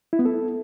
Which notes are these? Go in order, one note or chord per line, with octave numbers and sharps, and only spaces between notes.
E4
B3
A4